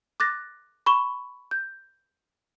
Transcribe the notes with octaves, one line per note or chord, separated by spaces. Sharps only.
D6 F#6 A6 A#6
B5 C#6 E7 G7
G6